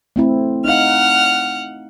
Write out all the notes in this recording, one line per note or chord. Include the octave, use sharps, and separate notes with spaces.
A3 C4 E4
D#4 F5 F#5 F6